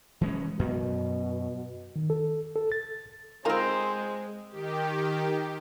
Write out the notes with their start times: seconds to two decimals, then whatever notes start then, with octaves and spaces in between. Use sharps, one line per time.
0.21 E3 G#3 C#4
0.59 F#2 B2
1.96 D#3
2.10 A4
2.56 A4
2.72 A6
3.45 G#3 C4 D#4 F4 A#4 C5 A#5
4.49 D#3 G4